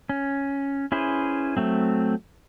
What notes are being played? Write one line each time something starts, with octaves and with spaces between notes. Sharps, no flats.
C#4
C#4 E4 G#4 B4 C5
F#3 A3 C4